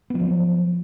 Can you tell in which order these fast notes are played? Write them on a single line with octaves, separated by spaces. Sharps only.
B3 F3 F#3